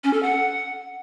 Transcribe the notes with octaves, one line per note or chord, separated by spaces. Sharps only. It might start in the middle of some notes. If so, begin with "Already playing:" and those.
C#4
A4
F#5